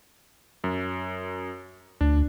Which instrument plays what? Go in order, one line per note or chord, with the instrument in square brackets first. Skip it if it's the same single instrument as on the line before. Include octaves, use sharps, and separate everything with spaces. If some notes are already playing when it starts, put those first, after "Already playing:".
[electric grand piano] F#2
[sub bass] D2 [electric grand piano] D4